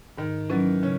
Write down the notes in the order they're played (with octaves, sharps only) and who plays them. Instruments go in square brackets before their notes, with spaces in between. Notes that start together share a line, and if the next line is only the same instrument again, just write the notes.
[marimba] G#2 [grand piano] D#3
[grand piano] E3 [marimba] F#3 C#4
[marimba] C#3 [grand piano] C#4